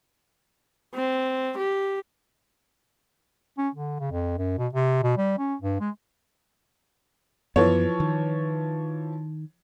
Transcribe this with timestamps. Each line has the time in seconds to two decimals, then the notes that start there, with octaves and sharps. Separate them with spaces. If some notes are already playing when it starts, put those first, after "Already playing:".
0.94 C4
1.58 G4
3.58 C#4
3.75 D3
4.00 C#3
4.11 F2
4.38 F#2
4.58 B2
4.73 C3
5.03 B2
5.17 G3
5.39 C#4
5.62 G2
5.81 G#3
7.56 F#2 E3 F3 B3 C#5
8.00 D#3